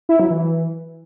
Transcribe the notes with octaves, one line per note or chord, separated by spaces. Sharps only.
E4
F#3
E3